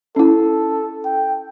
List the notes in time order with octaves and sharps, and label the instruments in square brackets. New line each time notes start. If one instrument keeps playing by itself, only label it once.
[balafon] C#4 E4 [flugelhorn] A4
[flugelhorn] G5